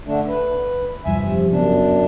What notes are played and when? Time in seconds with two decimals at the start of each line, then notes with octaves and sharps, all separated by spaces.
0.06 D3 A3 D4
0.28 B4
1.05 F1 G2 F3 E5 G#5
1.24 C3
1.52 F#2 C#3 B3 D4